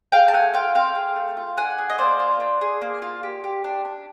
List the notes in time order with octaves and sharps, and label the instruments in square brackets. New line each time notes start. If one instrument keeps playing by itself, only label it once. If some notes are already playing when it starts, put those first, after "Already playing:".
[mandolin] G#4 F5 G5
A5
A3 F#5 G#5
F4 F5 G5
C4 F5 G5
G#4
A3
F4
D4 F#5 G#5
G#4
D#5
A#3 C5 D5
F4
D4
G#4
A#3
F4
G4
G4
D4
D4